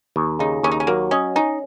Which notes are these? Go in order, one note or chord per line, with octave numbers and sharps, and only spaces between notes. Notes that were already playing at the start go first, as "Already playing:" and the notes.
D#2
C#3 D#4
D#2 C#4
D#4
C#4
F#3 A#3
C#4 D#5
C#4 D#4